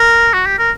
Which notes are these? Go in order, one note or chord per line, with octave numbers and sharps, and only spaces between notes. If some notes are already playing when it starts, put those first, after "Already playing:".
Already playing: A#4
F#4
G4
A#4